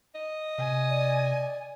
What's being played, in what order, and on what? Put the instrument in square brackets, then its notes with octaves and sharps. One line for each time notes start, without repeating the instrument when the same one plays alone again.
[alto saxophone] D#5
[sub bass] C3 [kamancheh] G#5
[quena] D5